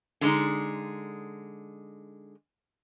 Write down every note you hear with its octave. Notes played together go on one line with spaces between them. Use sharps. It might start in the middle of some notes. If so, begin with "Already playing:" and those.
D3 G#3 D#4